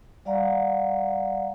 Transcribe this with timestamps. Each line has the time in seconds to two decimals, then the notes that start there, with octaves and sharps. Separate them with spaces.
0.25 G3 D5 F5 F#5 A#5